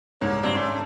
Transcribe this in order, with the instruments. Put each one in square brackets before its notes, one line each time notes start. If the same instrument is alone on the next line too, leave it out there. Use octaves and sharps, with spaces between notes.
[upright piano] C2 [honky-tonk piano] G#2 [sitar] A#3 [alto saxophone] C#5
[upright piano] A#1 G2 G#6 [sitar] C4 [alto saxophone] D5
[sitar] A3 [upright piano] C#4 C6